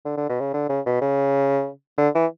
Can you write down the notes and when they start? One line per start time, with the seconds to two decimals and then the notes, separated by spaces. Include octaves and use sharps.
0.05 D3
0.17 D3
0.29 B2
0.40 C#3
0.54 D3
0.69 C#3
0.86 B2
1.01 C#3
1.98 D3
2.15 E3